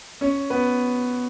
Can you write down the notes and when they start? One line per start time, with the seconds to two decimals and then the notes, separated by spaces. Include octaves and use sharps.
0.21 C#4 C#5
0.50 B3 B4